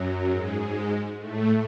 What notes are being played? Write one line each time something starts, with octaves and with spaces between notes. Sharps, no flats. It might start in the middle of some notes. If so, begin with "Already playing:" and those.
Already playing: F#2 F#3
G#2 G#3
G#2 G#3
A2 A3